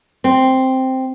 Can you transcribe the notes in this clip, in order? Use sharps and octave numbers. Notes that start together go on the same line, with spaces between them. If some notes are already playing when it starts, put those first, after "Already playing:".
C4